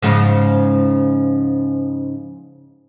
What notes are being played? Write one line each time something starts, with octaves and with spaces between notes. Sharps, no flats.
G#2 C#3 F3